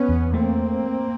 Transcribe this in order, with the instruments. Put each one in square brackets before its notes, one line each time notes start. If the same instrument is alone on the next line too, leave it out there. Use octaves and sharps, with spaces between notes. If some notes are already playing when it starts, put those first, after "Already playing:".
Already playing: [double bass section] B3 C#4
[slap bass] E2
[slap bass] A3 [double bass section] A#3 C4